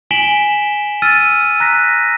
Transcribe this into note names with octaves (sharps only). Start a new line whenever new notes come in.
G#5 B6 D7 E7 F#7 G7
E6 F6 A6 D#7
A#5 F#6 A#6 B6